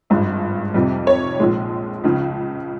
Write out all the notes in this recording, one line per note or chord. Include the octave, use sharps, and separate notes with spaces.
G#1 G2 F3 G#3
F2 C3 G3
C#5
A#1 A#2 F3 G#3
C#2 C#3 F3